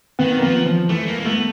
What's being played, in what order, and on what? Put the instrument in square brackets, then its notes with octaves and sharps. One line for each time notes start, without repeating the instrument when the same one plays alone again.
[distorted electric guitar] D#3 [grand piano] B3
[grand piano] A#3
[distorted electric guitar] F3 [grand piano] B3
[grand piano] F3
[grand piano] E3 [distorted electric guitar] A3
[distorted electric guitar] A#3
A#3
[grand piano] A3 [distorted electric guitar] B3